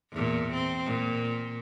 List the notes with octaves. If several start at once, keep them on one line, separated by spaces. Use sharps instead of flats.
E2 A#2
C4
A#2